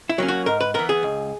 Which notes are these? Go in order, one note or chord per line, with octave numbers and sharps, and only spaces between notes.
E4
F#3 A#3 C#4
F#4
G#2 A#4
B4
E3 B3 A#4
G#4
C#2